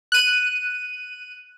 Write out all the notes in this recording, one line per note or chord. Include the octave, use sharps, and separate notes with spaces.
F#6 D#7